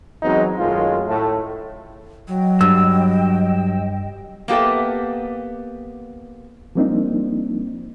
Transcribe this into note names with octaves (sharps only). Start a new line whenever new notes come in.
E2 F#3 G#3 B3 C4 D#4
F#2 D#3 G#3 A3 F4
A2 A3
F#3 D#5 G5
G2 E6
A#3 B3 G4 A4 E5
F3 G3 A#3 C4 D4 D#4